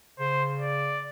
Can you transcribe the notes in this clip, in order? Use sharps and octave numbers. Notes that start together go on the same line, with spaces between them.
C#3 C5
D5